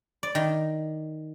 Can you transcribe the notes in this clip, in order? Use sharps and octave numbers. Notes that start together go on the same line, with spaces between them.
D5
D#3